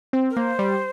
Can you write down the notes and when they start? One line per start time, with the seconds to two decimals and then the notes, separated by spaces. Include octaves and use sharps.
0.13 C4
0.30 A#4
0.37 A#3 C5
0.59 G3